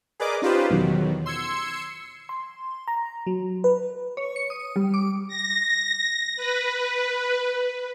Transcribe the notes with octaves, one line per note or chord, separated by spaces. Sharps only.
G#4 A#4 B4 D5 D#5 D6
C#4 D#4 F4 G4 B4 C5
E2 B2 D#3 F#3
C6 E6 G#6 C#7
C6
A#5
F#3
B4
C#5
C#7
D#6
G3
D6
A#6
B4